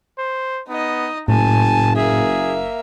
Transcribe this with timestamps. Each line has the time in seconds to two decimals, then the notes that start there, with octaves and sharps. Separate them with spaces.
0.18 C5
0.69 B3 D#4 D#5
1.28 F#1 A2 G#5 A5
1.96 A#3 G#4 E5